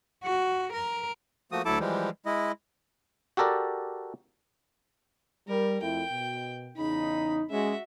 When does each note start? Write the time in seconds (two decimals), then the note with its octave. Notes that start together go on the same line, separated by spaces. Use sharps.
0.24 F#4
0.73 A#4
1.52 F3 A3 A#3 F#4 D#6
1.65 D2 F#3 E4 A4 A5 D6
1.80 E3 F3 G3 G#3
2.26 G#3 E4 D#5
3.37 F#4 G4 A4 A#4 D5
5.48 G3 A#4
5.82 F2 A3 E4 G5
6.12 B2
6.77 E2 C#3 D#4 B5
7.50 G#3 C#4 F#4 E5